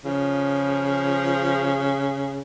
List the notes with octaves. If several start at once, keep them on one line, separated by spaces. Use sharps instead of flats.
C#3 F3